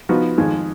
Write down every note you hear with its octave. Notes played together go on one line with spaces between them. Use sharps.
F3 B3 D#4 F#4
F2 D#3 G#3